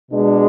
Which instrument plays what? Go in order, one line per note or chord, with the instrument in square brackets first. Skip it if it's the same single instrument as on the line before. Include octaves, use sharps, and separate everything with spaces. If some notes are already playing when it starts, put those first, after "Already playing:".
[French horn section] B2 G#3 D4